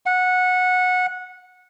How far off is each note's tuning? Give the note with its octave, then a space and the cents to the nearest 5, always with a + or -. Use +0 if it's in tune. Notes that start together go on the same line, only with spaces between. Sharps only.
F#5 -15